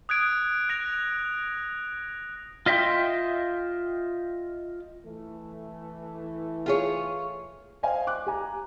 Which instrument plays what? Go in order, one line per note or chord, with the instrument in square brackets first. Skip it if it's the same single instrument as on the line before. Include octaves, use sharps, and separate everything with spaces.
[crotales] D#6 F#6 G#6 D7
F#6 A#6 D7 F7
[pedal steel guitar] F4 D#5 E5 G5 C6
[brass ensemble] E3 A3
[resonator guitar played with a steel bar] F4 G#4 C#5
[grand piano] C5 D5 D#5 F5 G5 G#5
D6 F#6
G4 G#5 A#5